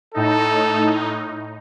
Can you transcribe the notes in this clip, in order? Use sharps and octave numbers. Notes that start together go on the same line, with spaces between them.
A2 D#4 A4